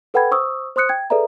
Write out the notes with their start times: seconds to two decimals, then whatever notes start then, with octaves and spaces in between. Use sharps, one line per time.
0.14 A4 B4 F#5 G5 B5 G#6
0.31 C5 C#6 D#6 E6
0.76 C5 C6 D#6 F#6 C#7
0.89 G5 G#6
1.10 G#4 A4 B4 D5 E5 A#5